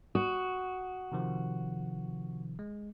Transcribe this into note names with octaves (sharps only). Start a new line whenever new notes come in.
F#4 D#6
C3 D#3 F3
G#3